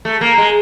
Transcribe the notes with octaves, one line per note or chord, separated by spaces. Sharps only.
A3
A#3
G#3